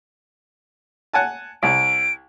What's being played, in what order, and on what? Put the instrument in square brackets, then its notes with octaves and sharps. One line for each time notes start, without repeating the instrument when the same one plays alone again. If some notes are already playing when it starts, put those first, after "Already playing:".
[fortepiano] F#5 G#5 A5
[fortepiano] C2 [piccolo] D7